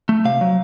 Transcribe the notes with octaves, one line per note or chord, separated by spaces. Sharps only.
A3
C3 F5
F#3